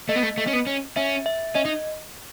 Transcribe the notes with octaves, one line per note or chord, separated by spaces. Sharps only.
A3 D#5
B3
A3
A3
C#4
B3
C#4
C#4 E5
E5
C#4 D#5
D#4